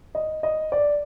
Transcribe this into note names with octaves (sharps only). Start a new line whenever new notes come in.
D#5
D#5
D5